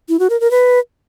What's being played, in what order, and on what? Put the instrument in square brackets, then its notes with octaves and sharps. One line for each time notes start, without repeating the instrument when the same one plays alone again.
[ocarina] E4
F#4
A#4
A#4
B4